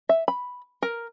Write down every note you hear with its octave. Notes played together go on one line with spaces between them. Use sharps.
E5
B5
A#4